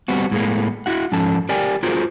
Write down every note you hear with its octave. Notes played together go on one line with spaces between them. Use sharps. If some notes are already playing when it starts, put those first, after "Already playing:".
G3 B3 C4 F#4
A2 G#3 A#3 B3
E4 F#4 F#5
G#2 F3 C#4 A4 A5
G4 A#4 D5 G5 G#5
F4 F#4 G#4 A#4 C5